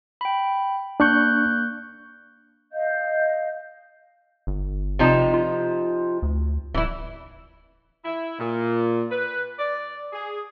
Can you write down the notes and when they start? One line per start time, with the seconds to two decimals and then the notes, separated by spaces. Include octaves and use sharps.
0.21 G5 B5
1.00 A#3 D4 C#6 F#6 G6
2.73 D#5 F5 G6
4.47 G1
4.99 C3 F3 D#4
5.34 F4
6.22 D2
6.74 D1 E3 E4
8.05 E4
8.40 A#2
9.11 B4
9.59 D5
10.13 G#4